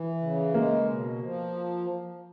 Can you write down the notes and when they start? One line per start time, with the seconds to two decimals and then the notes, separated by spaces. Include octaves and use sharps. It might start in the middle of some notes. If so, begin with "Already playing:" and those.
Already playing: E3
0.21 C#3
0.54 G#3 A#3
0.88 B2
1.21 F3